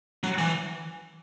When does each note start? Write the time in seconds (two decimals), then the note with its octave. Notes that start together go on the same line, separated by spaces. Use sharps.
0.23 F#3
0.38 E3